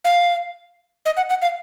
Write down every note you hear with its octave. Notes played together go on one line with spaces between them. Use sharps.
F5
D#5
F#5
F#5
F5